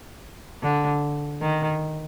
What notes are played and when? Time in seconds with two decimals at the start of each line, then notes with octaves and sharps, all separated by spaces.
0.63 D3
1.42 D#3